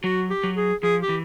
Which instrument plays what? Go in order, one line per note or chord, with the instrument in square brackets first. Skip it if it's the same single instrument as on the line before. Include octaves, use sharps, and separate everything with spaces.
[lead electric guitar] F#3 [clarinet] F#4
[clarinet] G4
[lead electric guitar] F#3
[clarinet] G#4
[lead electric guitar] F3 [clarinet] G#4
[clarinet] G4
[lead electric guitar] E3